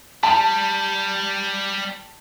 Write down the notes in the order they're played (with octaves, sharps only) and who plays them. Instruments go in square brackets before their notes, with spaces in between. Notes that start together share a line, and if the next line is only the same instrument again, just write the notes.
[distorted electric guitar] G3 [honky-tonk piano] A5